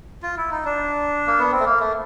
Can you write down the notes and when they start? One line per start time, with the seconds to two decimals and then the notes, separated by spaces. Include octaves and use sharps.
0.23 F4
0.37 E4
0.51 D#4
0.65 D4
1.27 A#3
1.39 B3
1.52 C4
1.60 A3
1.66 A#3
1.80 A3